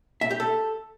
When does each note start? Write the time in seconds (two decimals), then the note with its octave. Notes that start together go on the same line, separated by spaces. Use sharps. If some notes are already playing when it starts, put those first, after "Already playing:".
0.21 E5
0.31 G4
0.40 A4